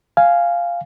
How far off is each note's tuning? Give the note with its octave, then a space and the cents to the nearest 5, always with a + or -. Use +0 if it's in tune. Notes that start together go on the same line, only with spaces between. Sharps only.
F5 -5 G#5 +0